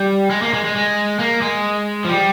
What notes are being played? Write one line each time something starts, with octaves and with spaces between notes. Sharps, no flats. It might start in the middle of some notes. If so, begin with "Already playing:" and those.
Already playing: G3
G#3
A#3
G#3
G#3
G#3
A#3
G#3
F3
G3